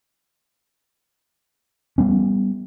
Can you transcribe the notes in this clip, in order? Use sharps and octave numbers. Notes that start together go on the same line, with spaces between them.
G3 B3 C#4